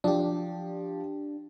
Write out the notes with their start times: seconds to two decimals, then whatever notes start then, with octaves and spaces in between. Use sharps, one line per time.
0.04 F3 D4 G4